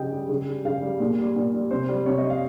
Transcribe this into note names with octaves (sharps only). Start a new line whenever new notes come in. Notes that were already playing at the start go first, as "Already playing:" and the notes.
Already playing: C#3 G3 D#5 G5
G3
C#3
G3
C#3 F5
G3
A#2
G3
A#2
G3
C3 C5
G3
C3 C#5
D#5
G3
F5